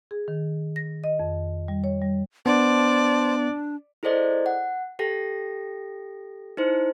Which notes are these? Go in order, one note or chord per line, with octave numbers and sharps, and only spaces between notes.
G#4
D#3
A#6
D#5
F2
G3
C#5
G3
B3 D4 C5 D5 A5
E4 G#4 A4 C5 D5 D#5
F#5
G4 A4 G5 A#6
D#4 E4 C5